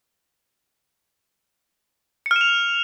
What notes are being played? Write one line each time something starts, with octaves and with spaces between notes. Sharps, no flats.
C#7
F6
E7
F7